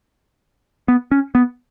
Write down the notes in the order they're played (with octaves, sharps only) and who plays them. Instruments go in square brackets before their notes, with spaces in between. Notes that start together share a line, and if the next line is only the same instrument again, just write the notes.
[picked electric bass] B3
C#4
B3